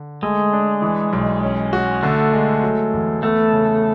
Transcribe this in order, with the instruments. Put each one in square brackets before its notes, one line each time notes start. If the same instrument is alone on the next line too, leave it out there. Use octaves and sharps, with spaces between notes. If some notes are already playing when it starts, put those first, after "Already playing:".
Already playing: [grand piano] D3
[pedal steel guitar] G#3 [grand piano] A3
[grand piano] D4
E3
B1
C#4
F#4
[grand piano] D3 [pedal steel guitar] A3
[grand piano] G#3
F#3
E2
[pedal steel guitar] A3 [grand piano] B3
[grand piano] C#3